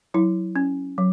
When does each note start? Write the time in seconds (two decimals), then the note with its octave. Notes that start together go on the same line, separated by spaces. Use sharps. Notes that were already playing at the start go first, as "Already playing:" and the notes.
0.14 F#3 E4
0.56 C#4
0.98 F#3